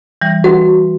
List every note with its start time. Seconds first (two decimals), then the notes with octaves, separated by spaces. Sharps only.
0.21 E3 G3
0.44 F#4 B4